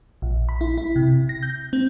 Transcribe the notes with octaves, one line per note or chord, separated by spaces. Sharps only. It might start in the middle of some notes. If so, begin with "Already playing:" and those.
A#1
B5
E4
E4
C3
A#6
G6
C4